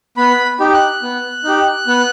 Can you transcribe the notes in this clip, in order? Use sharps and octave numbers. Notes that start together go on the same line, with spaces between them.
B3 B5
D#4 G4
F#6
B3
D#4 G4
B3